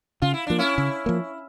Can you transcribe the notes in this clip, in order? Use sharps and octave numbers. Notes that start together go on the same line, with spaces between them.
C#3 F4
E4
F3 A#3 D4
C#4 E4
C#3
F3 A#3